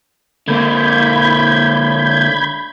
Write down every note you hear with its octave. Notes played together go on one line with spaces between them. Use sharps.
D3 A#3 B5 G6 G#6